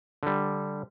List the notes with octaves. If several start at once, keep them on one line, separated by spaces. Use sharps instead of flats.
D3 G3